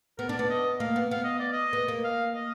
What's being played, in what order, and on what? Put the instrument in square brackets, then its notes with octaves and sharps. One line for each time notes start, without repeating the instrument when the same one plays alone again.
[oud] B3 [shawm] A#4
[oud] D4 [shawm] D5
[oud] B3 [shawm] D5
[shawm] D#5
[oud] A#3 [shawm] F5
[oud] B3
[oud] B3 [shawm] F5
[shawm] D#5
D5
D#5
[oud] B3
A#3
[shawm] F5
D#5